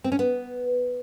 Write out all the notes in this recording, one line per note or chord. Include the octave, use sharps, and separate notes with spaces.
C4
C#4
B3